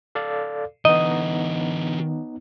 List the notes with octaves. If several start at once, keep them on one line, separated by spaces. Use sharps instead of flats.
A4 D5 F5
D3 E3 B3 D#4 D#5